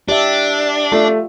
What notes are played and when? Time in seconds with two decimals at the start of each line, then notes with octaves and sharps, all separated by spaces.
0.08 D4 G4 D5 E5
0.92 A3 F4